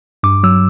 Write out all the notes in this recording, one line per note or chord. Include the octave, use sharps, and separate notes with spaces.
G2 D6
F#3 E6